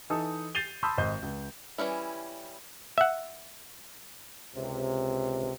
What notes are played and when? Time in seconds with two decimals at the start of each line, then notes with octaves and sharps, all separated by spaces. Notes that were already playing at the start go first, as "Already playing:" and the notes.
0.10 E3 D#4 A4 D#6
0.55 G6 A6 C7 D#7 F7 G7
0.83 A5 B5 C6 D#6 E6 G6
0.98 G#1 C5 D#5 G6
1.22 C#2
1.78 E3 G3 C#4 E4
2.98 E5 F#5
4.56 C#2 C3